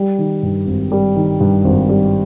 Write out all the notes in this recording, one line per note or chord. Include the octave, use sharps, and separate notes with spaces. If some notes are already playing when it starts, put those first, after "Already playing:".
Already playing: G3
D#3
G2
G#1
G3
D#3
G2
G#1
G3